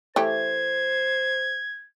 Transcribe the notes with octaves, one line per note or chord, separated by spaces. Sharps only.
E3 A3 G4 C5 G#6